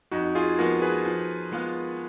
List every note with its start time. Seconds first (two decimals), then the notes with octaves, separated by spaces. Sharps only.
0.11 F2 D#4 F#4
0.35 F4 G#4
0.58 F3 G#3 B3 F#4 A#4
0.82 G#4 B4
1.05 F3
1.52 G#3 B3 F4